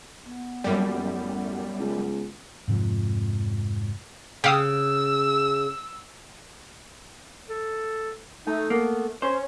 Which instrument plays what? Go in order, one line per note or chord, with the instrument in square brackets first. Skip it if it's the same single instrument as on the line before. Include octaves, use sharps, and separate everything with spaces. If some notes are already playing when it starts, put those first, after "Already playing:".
[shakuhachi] B3
[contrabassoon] D#1 [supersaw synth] F#2 G3
[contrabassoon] A1
C#2
[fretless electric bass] F2 G#2 C3 F3
[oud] C#3 [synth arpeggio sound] G4 F5 D#6 [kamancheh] E6
[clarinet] A4
[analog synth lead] A3 [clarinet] D#4
[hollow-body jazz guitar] A#3 [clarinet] B3
[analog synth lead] C#4 [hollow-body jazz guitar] C5 [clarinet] C#5